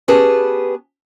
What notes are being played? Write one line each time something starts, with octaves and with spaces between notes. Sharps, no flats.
B3 C#4 G4 G#4 B4 A5